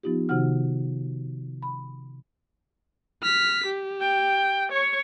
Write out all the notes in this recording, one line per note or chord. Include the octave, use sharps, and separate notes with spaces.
F3 B3 D#4 F4 G4
C3 D#3 D#4 F#4 F#5 F6
B5
F6 B6
G4
G5
C#5 C#6